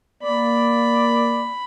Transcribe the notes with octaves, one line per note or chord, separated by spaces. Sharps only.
A#3 D5 B5